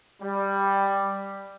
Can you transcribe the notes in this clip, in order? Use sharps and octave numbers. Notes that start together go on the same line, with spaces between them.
G3